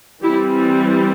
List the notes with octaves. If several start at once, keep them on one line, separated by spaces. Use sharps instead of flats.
E3 G3 C4 E4 G4